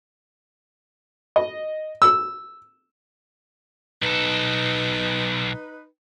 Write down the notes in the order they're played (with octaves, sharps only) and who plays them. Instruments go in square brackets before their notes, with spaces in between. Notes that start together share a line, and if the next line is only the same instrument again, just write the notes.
[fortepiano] D#5
E6
[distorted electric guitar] B1 A4 [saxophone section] D#4 B4